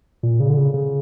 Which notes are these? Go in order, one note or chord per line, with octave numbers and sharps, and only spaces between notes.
A#2
C#3
D3
C#3
C#3